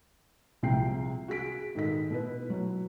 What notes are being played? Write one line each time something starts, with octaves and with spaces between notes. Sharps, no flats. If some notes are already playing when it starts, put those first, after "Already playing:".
C2 C3 F3 G#3 G5 C7
F#4 G#4 B6 D7
G#2 D#3 A4 D#5 B6
B2 E4 B4
F#3